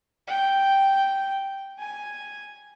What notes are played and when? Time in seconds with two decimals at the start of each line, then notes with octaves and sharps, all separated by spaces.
0.28 G5
1.79 G#5